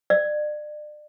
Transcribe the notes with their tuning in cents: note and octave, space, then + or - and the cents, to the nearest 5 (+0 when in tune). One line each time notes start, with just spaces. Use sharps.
D5 +35